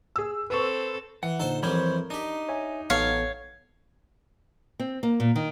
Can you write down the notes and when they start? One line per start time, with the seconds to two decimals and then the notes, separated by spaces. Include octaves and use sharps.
0.16 G#4 E6
0.50 C4 A4 B4 C#6
1.23 E3 F#5
1.40 A#2 D3 D#4 A4 C5
1.63 F2 E3 G3 A#4 C5 C#5 B5
2.10 D4 D#4 G4
2.49 C#5 E5 G#5
2.90 A1 F#3 B3 A4 C#5 F5
4.80 C4
5.03 A#3
5.20 A#2
5.35 D#3